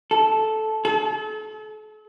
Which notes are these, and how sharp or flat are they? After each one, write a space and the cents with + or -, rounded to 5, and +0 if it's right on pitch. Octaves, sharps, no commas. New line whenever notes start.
A4 -10
A4 -40